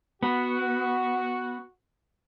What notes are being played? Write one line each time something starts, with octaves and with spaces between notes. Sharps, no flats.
B3 F#4